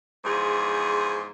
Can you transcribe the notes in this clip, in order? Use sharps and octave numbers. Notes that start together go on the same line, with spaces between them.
E2 G#2 F3 G#4